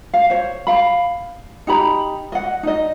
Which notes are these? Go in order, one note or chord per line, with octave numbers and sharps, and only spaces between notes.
F5
C5 C#5
F5 B5
D#4 G4 A#5 B5
D#5 F#5
D#4 D#5